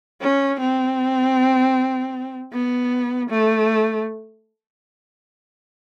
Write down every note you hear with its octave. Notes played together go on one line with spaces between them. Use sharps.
C#4
C4
B3
A3